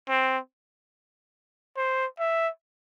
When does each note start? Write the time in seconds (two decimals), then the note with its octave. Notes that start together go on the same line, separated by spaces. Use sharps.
0.09 C4
1.77 C5
2.19 E5